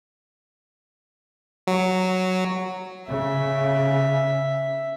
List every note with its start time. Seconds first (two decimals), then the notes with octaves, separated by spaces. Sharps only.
1.67 F#3
3.09 C#3 E5